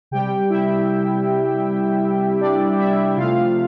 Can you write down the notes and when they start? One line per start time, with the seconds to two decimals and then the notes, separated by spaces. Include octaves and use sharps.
0.11 C3 G3 G4 G5
0.50 E4 E5
2.40 D4 D5
2.78 E4 E5
3.17 C3 F3 A3 F4 F5